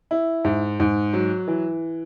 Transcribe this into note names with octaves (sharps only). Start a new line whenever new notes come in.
E4
G#2
G#2
F#3
E3